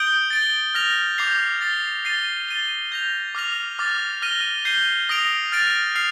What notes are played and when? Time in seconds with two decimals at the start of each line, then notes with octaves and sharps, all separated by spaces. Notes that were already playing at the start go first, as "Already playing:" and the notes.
Already playing: D#6 G6 D7 G7
0.30 A6 D7 G7
0.75 F6 A#6 F7
1.18 D6 G6 C7 F7
1.61 A6 C7 G7
2.05 A6 C7 D#7 G7
2.49 A6 D#7 G7
2.92 G6 A#6 F7
3.35 D6 F6 A#6 F7
3.79 D6 F6 A6
4.22 F6 A#6 D#7 G7
4.65 G6 C7 D#7 G7
5.09 D#6 A#6 D7 F7
5.52 F6 A6 D7 F7
5.95 F6 C7 F7